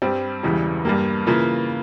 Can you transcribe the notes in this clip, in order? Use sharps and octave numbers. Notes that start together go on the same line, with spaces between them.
G2 G3 C4
E1 E2 C#3 E3 G3
G2 G3 A#3
C#3 E3 A#3 F4